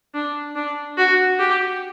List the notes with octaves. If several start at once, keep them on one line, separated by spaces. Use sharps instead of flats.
D4
D4
F#4
G4